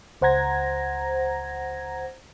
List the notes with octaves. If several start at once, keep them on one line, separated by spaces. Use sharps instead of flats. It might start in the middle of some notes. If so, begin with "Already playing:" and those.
C#2 C5 F#5 A#5 G#6 A#6